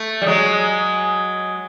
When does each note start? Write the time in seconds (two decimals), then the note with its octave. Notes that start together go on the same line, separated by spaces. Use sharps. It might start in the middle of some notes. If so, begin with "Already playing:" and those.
Already playing: A3
0.22 G3
0.26 F#3 G#3